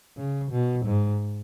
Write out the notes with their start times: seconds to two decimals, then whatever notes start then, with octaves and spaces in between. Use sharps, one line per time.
0.17 C#3
0.51 B2
0.86 G#2